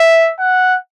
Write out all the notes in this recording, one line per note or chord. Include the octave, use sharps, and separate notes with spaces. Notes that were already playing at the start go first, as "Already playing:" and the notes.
Already playing: E5
F#5